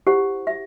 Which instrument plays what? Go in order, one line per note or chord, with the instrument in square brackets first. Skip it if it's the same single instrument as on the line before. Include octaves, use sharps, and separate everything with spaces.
[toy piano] E4 G4 C5 F#5
E5